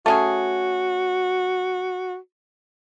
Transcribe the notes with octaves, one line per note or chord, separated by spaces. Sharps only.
A3 C#4 F#4 G#4